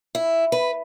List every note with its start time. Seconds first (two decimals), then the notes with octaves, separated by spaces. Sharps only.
0.15 E4
0.52 B4